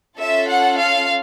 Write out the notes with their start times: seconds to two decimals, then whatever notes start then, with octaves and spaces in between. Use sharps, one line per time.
0.18 C#4 F4 A4 E5
0.49 F#5
0.78 F5